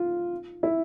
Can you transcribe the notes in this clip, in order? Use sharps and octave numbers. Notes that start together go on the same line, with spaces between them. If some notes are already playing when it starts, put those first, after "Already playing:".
Already playing: F4
E4